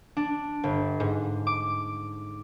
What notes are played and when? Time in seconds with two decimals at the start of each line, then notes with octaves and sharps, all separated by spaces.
0.17 D4
0.64 G1
1.00 G#2
1.47 D6